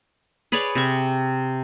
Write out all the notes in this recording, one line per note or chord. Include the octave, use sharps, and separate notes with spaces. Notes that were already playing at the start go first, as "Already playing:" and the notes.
G#4 B4 C#5 D5
C3 C#6